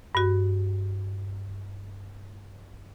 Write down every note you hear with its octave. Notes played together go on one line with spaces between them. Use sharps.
G2 F#4